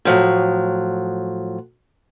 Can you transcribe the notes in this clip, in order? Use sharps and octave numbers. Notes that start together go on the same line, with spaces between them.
A2 F3 F#3